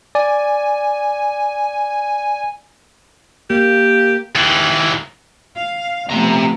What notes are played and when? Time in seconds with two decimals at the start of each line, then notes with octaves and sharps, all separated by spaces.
0.15 D5 G#5
3.50 A#3 G4
4.36 D#2 E3
5.56 F5
6.10 C3 F3 A3 B3 A#5